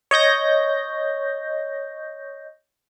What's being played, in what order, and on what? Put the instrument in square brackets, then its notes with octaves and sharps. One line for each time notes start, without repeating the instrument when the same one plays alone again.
[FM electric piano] C#5 D#5 G6 A#6